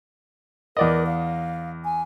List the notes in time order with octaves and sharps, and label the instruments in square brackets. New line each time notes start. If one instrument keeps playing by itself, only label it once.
[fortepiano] E2 D5 D#5 [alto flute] A#4
[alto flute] F5
G#5